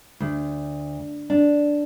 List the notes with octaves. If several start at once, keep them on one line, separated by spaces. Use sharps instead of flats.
D2
D4